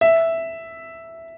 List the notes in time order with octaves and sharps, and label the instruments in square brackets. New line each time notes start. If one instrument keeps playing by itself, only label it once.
[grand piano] E5